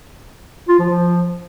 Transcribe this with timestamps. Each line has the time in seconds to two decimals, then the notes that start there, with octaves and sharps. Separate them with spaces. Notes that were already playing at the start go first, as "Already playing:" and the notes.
0.69 F4
0.79 F3
0.89 F3